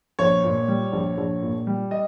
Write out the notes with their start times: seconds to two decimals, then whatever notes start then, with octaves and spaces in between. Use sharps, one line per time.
0.19 A#1 C#5
0.44 A#2
0.68 G3
0.93 A#1
1.18 A#1
1.42 A#2
1.67 G3
1.91 D#5